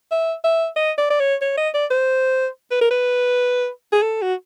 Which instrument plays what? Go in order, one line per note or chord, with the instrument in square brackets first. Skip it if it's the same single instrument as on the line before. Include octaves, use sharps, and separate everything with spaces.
[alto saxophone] E5
E5
D#5
D5
D5
C#5
C#5
D#5
D5
C5
B4
A#4
B4
G#4
A4
F#4